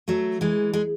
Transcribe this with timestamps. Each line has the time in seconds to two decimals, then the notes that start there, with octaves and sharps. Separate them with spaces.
0.08 F#3 A3
0.41 E3 G#3
0.73 G#3